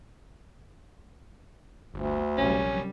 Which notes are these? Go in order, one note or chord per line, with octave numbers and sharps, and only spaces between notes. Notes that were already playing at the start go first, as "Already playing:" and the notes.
G1 D2
A#1 F#2 C3 G3 C#4